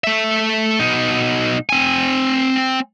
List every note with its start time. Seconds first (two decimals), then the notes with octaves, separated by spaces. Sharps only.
0.04 A3 E5
0.79 B2 D#4
1.69 C4 G#5